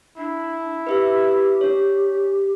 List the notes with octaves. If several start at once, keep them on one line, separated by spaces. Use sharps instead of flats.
D4 E4
G4 B4 E5 E6
D4 C#5